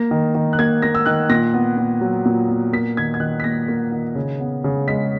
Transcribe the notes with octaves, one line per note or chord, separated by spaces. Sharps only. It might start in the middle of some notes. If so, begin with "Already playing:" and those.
Already playing: A#3 A#6
D#3
D#3
F#6
A#3 G#6
A#3 A#6
E6
D#3 F#6
A#2 A#6
B3
A#2
F#3
A#2
B3
A#3 B6
D#3 G#6
G#6
D#3 F#6
B6
A#3 A#6
A#3
D#3
C#3
B3
C#3
G#3 B6